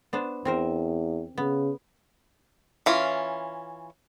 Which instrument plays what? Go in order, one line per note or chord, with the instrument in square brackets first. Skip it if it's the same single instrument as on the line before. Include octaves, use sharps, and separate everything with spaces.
[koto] B3 D4 C5
[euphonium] E2 [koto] C4 A#4 C5
[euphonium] C#3 [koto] B3
[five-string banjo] E3 C#4 F4